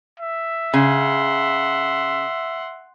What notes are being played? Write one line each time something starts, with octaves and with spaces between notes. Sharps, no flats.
E5
C#3 F#5 C6